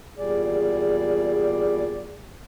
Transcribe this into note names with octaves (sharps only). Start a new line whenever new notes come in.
E2 A#2 G3 G#4 D5